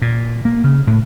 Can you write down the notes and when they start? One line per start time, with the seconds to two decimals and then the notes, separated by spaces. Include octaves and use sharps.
0.02 A#2
0.45 A#3
0.64 C#3
0.87 A2